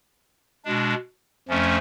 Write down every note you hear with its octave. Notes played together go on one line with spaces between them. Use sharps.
B2 G#3 D4
F2 F3 A3 C#4